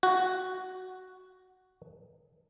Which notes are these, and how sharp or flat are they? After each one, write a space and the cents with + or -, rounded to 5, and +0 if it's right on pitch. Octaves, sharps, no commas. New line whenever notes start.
F#4 +5